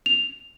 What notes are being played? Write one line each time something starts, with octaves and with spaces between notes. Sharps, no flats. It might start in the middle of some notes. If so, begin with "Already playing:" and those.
F7